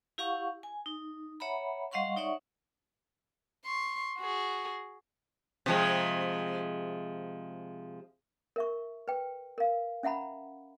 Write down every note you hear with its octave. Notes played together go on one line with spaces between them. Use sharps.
E4 G4 F5 F#5 C#6
G#5
D#4
C#5 E5 F#5 A#5 B5
G3 D#5 F5 F#5 C6 C#6
D#4 C#5 D5 E5 F#5 C#6
C6 C#6
F#4 G#4
C3 F3 G#3
A#4 E5 C#6
B4 G5
A#4 F5
C#4 E5 F#5 A#5 B5